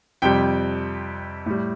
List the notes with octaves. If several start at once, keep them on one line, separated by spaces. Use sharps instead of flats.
F2 C3 G3 G5
A2 G3